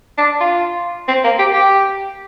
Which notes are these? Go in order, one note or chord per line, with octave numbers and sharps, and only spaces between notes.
D4
F4
C4
A#3
G4
G4